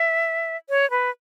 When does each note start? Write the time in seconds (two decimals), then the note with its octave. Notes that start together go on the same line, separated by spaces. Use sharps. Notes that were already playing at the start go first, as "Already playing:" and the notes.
Already playing: E5
0.70 C#5
0.91 B4